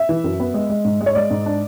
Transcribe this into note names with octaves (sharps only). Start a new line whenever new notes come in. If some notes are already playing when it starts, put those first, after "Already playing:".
Already playing: E5
E3
F#2
B3
G#3
G#3
G#2
G#3
C#5
G#3 D5
G#2
D4